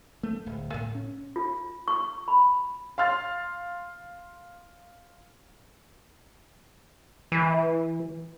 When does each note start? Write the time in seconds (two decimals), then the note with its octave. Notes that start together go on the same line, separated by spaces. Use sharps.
0.23 A3
0.46 D1
0.74 A2
0.95 C#4
1.36 F4
1.88 C#6
2.28 B5
2.98 F5 C6 F6 A6
7.32 E3